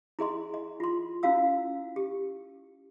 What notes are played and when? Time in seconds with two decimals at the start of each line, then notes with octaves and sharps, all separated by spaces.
0.19 E4 G#4 D#5 C6
0.54 D#5
0.80 F4 C6
1.23 C#4 E4 F#4 F5 E6
1.96 G4